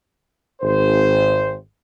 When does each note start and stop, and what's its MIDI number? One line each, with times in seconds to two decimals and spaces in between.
0.62 1.54 32
0.62 1.54 72